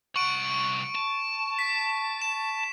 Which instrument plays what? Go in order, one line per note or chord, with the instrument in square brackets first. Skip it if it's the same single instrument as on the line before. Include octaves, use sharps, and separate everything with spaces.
[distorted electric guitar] C2 F#5 [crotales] C#6 D7
[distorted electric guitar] A5
[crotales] B6
E7